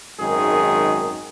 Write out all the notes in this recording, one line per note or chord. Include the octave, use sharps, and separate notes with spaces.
G#1 F#2 D#3 G#3 G#4